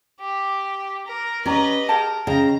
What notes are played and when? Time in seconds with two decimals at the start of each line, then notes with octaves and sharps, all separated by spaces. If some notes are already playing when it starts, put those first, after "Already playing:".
0.20 G4
1.07 A#4
1.46 C#4 G4 B4 D5 D#5 A#5
1.89 G#4 A#4 G5 A5
2.27 C#3 D#5 G5 A#5